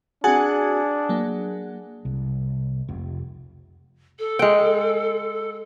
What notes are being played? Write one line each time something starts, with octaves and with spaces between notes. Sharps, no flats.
C4 D4 F#4 G#4 F#5 G#5 F#6
F#3 A#3
C2
F1
A4
G#3 G5